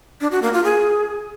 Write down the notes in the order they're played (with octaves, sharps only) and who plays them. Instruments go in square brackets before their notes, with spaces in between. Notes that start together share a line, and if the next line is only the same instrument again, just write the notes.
[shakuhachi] D4
F#4
A#3
F4
G#4